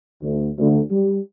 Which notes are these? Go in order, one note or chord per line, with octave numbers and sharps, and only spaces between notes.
D2
D2
G3